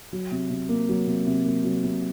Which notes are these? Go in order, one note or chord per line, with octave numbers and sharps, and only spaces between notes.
F#3
C3
C3
A#3
F#3
C3
C3
A#3
F#3
C3